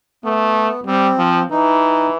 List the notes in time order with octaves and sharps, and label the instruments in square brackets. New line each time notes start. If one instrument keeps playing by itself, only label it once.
[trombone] A3 [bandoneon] B3
[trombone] G3 [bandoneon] C4
[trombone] F3
[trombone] E3 [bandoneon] D#4